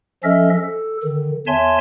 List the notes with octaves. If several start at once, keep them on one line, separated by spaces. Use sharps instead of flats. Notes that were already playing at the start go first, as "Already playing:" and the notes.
F3 C#4 A4 D#5 E5 F6
A4
D3 D#3
E2 C#5 E5 G#5 A5 C6